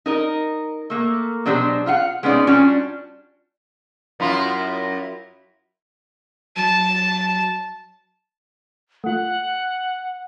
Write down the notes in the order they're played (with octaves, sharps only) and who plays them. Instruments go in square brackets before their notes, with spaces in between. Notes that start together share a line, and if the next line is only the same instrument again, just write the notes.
[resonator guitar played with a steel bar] D#4 A#4 D#5
A3 A#3
B2 F#3 D4 G4 C5
F4 F5 F#5
G#3 B3 C#4 D#4 D5
G3 C#4 D4 F4 F#4
[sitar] F#2 E4 F4
[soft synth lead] F#3 [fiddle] A5
[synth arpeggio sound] A3 F4 [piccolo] F#5